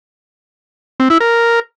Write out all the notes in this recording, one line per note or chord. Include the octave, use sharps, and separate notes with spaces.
C4
E4
A#4